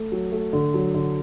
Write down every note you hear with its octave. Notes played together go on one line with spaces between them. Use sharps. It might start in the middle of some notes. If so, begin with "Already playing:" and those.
Already playing: A3
F#3
A3
D3
F#3
D3